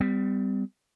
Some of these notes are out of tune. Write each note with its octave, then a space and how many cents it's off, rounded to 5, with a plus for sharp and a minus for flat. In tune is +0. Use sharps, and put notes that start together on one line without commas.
G3 +10 C4 -45